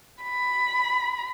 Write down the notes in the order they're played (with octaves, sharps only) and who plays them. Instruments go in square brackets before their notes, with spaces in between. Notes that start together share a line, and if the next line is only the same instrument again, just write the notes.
[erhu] B5